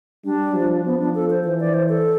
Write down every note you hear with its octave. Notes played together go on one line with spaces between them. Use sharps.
G3 D4
F3
F3 B3
D4
A4
C5
E3 C5
D5
C5
A4